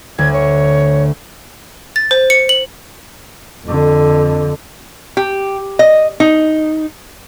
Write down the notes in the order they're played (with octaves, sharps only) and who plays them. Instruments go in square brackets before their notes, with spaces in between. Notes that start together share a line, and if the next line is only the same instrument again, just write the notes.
[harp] D2 [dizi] G#6
[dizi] C#5
[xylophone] A6
C5
C#7
F#7
[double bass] F2 D3
[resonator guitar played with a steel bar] G4
D#5
D#4